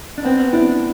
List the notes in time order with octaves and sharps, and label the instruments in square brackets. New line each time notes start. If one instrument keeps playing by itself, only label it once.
[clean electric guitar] D4
[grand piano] B3 [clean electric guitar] C4
[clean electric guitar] D4 [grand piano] E4